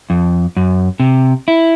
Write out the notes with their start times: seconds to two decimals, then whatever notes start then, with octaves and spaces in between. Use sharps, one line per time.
0.10 F2
0.57 F#2
1.00 C3
1.48 E4